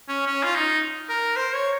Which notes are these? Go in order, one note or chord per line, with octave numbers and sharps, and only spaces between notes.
C#4
C#4
F4
D#4
A#4
C5
C#5